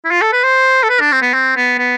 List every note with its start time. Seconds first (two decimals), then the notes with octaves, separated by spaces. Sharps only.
0.05 E4
0.11 F4
0.22 A4
0.33 B4
0.44 C5
0.83 A4
0.90 B4
1.00 D4
1.12 C4
1.22 B3
1.34 C4
1.57 B3
1.79 B3